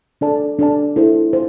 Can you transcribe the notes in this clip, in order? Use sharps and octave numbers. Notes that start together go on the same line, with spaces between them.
D4 A4 D5 A5
D4 A4 D5 A5
E4 A4 C5
C5